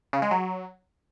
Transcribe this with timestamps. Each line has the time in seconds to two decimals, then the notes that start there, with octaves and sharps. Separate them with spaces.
0.13 C#3
0.22 G#3
0.31 F#3